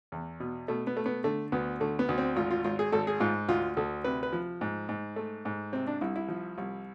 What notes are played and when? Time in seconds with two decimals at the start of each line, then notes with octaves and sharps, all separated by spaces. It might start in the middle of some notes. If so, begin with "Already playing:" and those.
0.12 E2
0.40 B2
0.68 B2 A3
0.87 B3
0.97 A3
1.06 B3
1.24 D3 A3
1.52 D2 B3
1.80 D3 A3
1.99 B3
2.09 D2
2.18 C4
2.36 G#1 F4
2.51 F4
2.64 G#1 F4
2.79 G#4
2.92 G#1 A4
3.07 G#4
3.20 G#2 F4
3.48 D2 F4
3.77 D2 A4
4.04 C3 B4
4.23 B4
4.32 F3
4.61 G#2
4.89 G#2
5.16 A3
5.45 G#2
5.72 C3 C4
5.87 D4
6.01 C2 E4
6.16 E4
6.28 F3
6.58 C2